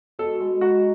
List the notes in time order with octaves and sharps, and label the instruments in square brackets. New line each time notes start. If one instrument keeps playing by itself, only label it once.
[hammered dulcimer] B2 [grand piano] A4
[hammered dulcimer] G#3
[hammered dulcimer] D#4 [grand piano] F#4